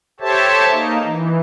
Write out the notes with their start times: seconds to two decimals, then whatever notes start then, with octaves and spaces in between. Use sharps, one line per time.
0.20 G4 A4 C5 C#5 E5 A5
0.71 A#3 D#4
1.04 E3